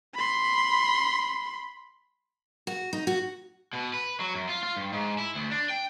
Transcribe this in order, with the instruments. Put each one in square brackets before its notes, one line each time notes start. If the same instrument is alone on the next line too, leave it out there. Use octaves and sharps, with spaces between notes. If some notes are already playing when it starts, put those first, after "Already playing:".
[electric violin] B5 C6
[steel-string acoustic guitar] F#4
D#4
F#4
[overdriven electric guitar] B2
B4
F#3
F#2
F4
F4
G2
G#2
E4
D2
D4
G5